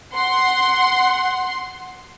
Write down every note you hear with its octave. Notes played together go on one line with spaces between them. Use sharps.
F#5 C6